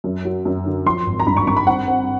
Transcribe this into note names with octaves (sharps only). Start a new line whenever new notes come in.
F#2
F#3
F#2
D3
F3 C6
G#1
A#5
G2 B5
C#6
G2 C#6
B5
C4 F#5
C4